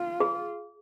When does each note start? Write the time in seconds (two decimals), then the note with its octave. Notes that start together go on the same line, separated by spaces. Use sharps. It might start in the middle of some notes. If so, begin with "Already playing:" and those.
Already playing: F4
0.20 G#4